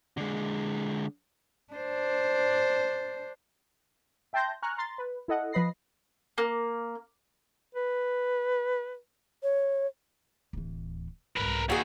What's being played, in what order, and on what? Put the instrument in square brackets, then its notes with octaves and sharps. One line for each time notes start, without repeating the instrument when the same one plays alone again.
[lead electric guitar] D3 G#3
[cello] D4 C5
[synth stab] E5 G5 A5 C6 G6 A#6
G#5 A#5 C#6 F6 F#6
A#5 C6 A6
B4
E4 A4 D#5 F#5
F3 B4 D#5 B5 A#6 C7
[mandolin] A#3
[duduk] B4
[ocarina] C#5
[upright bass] D1 E3
[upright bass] C2 G#2 [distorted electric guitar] A#4 B4
[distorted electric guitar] D#2 [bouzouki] F#4 G#4